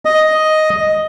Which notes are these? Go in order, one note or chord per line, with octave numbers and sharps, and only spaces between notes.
D#5